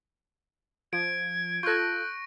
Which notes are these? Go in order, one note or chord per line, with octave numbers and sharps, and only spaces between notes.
F3 G#6 D7
F4 A4 C#6 F#6 G6 A#6